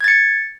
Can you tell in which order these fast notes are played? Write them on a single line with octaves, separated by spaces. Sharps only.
G#6 A6 C#7